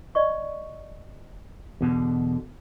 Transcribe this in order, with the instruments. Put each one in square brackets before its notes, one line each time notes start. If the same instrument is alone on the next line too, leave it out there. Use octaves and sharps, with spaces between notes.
[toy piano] D5 D#5 C#6
[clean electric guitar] E2 B2 D3